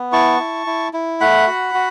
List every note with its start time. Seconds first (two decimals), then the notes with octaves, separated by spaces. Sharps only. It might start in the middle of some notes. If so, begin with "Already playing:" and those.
Already playing: B3
0.12 E4 A5 C#6
0.40 E4
0.67 E4
0.93 E4
1.21 A3 F#5 B5
1.47 F#4
1.74 F#4